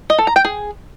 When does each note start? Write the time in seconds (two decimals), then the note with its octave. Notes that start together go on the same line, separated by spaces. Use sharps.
0.10 D#5
0.18 A4
0.27 A#5
0.36 G5
0.45 G#4